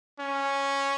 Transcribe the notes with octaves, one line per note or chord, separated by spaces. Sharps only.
C#4